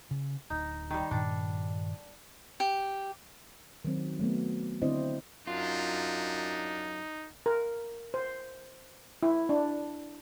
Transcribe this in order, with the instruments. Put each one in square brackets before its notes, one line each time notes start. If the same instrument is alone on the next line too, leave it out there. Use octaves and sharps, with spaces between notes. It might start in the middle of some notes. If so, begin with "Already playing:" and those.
[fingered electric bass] C#3
[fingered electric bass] D1 [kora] D#4
[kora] D#3 G3
[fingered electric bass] G2 A#2 D#3 [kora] D4
[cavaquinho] G4
[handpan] D#3 F#3 C4
F#3 A3 B3
D3 C4 E4 C5 D5 D#5
[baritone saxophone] F#2 [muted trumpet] D4 [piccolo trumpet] D#4 [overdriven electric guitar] F4
[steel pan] A#4
C5
E4
D4